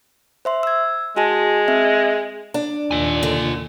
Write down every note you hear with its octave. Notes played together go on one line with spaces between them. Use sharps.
C5 E5 C6
E6 G#6
G#3 F#4 G#5 A5
C4 E5
D4
D#2 A#2 F4 G#5
D3